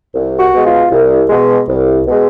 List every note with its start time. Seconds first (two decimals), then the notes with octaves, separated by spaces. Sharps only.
0.14 C2
0.39 F#4
0.53 B2 G#3
0.66 F4
0.91 C2
1.29 B2 G#3
1.68 C2
2.06 B2 G#3